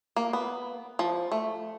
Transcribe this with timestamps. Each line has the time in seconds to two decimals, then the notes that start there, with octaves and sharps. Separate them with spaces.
0.16 A#3
0.33 B3
0.99 F3
1.32 A3